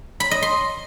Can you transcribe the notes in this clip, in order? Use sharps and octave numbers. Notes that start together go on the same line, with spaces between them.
B5
D#5
C6